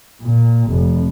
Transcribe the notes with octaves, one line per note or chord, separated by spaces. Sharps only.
A#2
F1